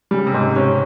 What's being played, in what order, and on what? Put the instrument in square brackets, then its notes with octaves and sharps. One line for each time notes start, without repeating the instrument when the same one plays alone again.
[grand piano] C#3 [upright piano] G3
[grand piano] C3
[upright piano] G#2
[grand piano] C3
[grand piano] C#3 [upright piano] C#4